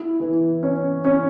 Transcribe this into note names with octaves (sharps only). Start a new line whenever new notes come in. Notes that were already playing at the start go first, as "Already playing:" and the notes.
Already playing: E4
E3
C#4
C#4